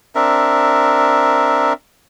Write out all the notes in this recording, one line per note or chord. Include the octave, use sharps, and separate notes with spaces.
C4 D4 A#4 E5